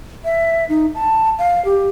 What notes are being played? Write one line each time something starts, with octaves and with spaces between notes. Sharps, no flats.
E5
D#4
A5
F5
G4